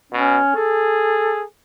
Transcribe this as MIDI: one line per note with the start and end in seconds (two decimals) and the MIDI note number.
0.12 0.40 47
0.12 0.55 61
0.56 1.44 68
0.56 1.40 69